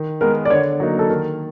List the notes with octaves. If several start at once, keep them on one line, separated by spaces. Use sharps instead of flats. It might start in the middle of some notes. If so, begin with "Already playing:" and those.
Already playing: D#3
G#3 B3 A#4
D5
D3 C#5
F#3 A#3 D#4
A4
D#3 A#4